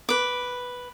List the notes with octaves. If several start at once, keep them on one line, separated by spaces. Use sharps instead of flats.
B4 D6